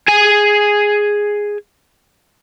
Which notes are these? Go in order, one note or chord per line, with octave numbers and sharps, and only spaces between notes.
G#4 G#5